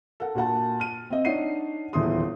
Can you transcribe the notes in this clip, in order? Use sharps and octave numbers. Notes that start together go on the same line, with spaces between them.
A4 A#4 F#5
A#2 F#4 F#5 A5
F6 D#7
C4 D#5
D4 D#4 C#5 F#5 C7 D#7
D#1 E2 B3 E5 C6 D#6